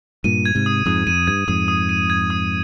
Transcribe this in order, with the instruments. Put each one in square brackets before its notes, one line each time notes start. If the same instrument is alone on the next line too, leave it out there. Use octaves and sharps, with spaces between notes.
[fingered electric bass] G2 A#2 [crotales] D#7
[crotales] G#6
[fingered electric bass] G#2 C3
[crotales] D#6
[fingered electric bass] F2 G#2 [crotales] D#6
[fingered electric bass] F2 [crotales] D#7
[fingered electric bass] G2 [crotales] G#6
[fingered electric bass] F2 G#2 [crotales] D#6
[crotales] D#6
D#7
G#6
D#6